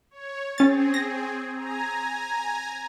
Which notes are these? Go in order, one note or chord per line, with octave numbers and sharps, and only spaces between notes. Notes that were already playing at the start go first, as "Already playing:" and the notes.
C#5
C4 C#4 G#4 A6
A#6
G#5 A#5